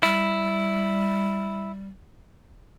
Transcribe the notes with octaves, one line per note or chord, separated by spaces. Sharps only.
G3 E4